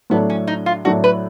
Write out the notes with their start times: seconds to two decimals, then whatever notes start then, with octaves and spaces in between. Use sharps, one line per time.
0.10 A2 F#3 A3 B3 D4
0.30 C#4
0.47 D#4
0.66 F4
0.85 A2 F#3 A3 D4 F#4
1.04 B4